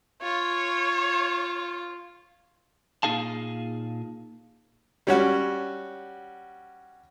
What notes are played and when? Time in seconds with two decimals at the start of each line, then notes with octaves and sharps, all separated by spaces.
0.22 F4 C#5
3.03 A#2 D#4 G#4 F5 A5
5.07 G3 C#4 F#4